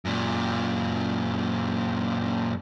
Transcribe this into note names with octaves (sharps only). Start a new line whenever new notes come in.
F#2 A#2